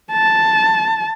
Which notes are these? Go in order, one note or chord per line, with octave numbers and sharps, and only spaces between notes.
A5